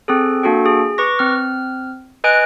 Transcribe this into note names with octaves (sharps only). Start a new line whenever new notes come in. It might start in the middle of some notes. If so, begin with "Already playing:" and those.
C4 G#4 A4
A#3 D4 F#4 A4 G5
G#4
B4 C#6 D6 A#6
C4 F6
B4 D#5 G#5 F#6 D7